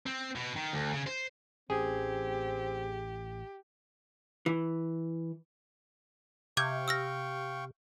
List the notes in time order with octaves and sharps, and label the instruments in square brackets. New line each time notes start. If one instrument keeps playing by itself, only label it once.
[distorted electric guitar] C4
B2
D#3
D2
C#3
C5
[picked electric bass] A1 C#4 [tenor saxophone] C4 [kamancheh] G4 [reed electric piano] G#4 G#6
[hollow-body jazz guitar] E3
[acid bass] C3 [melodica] F5 G5 C#6 [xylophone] D6 G6 G#6
[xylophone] E6 F6 A#6